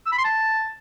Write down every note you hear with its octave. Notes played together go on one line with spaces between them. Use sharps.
E6
B5
C6
A5